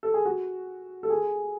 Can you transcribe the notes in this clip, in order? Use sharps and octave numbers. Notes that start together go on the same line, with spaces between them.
A4
G#4
F#4
A4
G#4